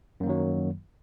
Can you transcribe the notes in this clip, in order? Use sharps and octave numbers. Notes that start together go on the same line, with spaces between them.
F#2 D#3 F#3 A#3